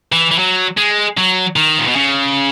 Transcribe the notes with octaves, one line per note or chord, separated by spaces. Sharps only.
E3
E3
F#3
G#3
F#3
D#3
A#2
B2
C#3